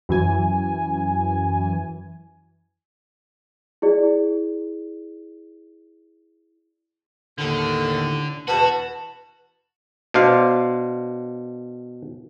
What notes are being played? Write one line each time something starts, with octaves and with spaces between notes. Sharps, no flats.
F#2 E3 G#5
E4 G#4 D5
D#2 A2 D3
E2 B2 F#4 B4 A5
B2 D4 C5 F5